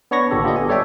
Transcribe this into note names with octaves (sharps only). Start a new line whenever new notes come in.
B3 D4 C#5 B5 C#6 A#6
G#1 A#2 D3 G4 A4
F4 G4 A4 D#5
B3 G#5
G3 A4 C#5 D5 E5 G5